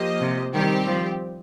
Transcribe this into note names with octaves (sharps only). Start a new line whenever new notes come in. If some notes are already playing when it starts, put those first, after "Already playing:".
Already playing: F3 A#3 G4 C5 D#5
C3
D#3 G3 C4 G4
F3